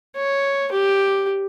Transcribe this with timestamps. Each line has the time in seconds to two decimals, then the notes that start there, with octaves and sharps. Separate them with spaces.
0.16 C#5
0.72 G4